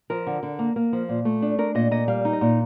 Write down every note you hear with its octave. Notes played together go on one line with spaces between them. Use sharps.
F3 A#4
D3
D3
A#3
A#3
F3
A#2
A3
D4
D4 A#4
A#2 D#5
A#2 D#5
G3 F5
D#4
D#5
A#2